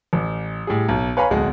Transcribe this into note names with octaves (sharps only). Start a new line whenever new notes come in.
A1
A2 G3 G#4
B1
B4 C#5 F5 G#5 A#5 B5
D1 B1 G#3 F#5